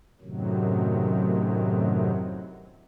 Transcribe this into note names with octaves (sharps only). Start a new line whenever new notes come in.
F#2 A2 C3 D#3 F#3